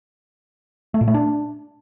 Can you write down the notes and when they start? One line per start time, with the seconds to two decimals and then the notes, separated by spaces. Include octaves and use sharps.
0.94 A3
1.01 A#2
1.08 A3
1.14 D4